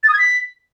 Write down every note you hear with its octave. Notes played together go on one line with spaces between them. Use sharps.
A6
D#6
G#6
B6